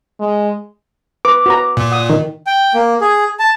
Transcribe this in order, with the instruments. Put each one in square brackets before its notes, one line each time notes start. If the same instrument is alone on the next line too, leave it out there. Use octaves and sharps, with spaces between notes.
[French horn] G#3
[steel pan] B4 [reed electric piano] D6
[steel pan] F#4 B4 A#5
[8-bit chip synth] A#2
[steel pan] F#5 D#6
[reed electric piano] D#3
[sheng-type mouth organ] G5
A#3
G#4
A5